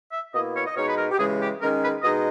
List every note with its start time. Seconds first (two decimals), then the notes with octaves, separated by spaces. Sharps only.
0.12 E5
0.33 B2 A#3 E4 D#5
0.55 C#5
0.66 D#5
0.75 B2 G#3 D#4 C#5
0.86 B4
0.97 A#4
1.11 G4
1.18 C#3 E3 G#3 G#4
1.40 G4
1.60 D#3 G#3 C#4 A#4
1.82 B4
2.03 B2 G#3 D#4 D#5